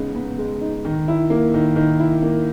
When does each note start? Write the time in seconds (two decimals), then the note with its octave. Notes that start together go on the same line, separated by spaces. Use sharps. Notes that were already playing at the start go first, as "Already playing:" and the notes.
Already playing: C#3 G#3 B3 D#4
0.15 B3
0.38 G#3
0.61 D#4
0.85 D#3
1.08 E4
1.30 A#3
1.54 D#3
1.76 D#3
1.99 E4
2.22 A#3